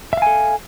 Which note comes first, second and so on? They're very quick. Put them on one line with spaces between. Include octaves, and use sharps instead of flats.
E5 F5 G#5 A4